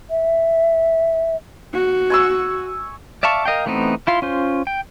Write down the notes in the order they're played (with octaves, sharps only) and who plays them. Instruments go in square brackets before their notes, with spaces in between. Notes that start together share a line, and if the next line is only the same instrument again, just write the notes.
[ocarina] E5
[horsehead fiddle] F#4
[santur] G#5 C#6 E6
[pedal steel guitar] D5 E5 F5 A5 C#6
A#4 D#5 F5 G5
E3 A3 B3 C4 D#4
E4 F4 C6
C#4 F4 C5
G5